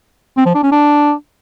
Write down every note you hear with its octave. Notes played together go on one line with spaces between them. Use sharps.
C4
F3
D4
C#4
D4